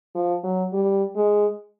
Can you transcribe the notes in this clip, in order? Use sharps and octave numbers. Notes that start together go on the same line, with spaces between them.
F3
F#3
G3
G#3